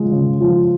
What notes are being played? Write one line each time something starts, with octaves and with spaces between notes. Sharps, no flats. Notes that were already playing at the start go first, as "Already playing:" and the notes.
Already playing: C#3 F3 G#3
C#3
F3